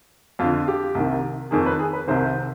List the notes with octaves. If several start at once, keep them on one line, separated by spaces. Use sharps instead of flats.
F2 D3 F4
G4
C2 C3 D#3
F2 D#3 G#4
B4
G#4
B4
C2 C3 D#3 C5